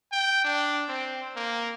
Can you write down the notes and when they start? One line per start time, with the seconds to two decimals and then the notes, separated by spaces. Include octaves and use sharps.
0.12 G5
0.45 D4
0.88 C4
1.36 A#3